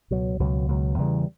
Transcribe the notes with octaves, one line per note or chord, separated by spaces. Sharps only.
C#2 B2 F#3
C#2 B2 F#3
C#2 B2 F#3
E2 C#3 E3 G3